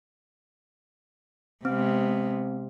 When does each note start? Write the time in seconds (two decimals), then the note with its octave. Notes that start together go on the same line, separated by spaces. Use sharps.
1.65 C3 G#3 B3 C4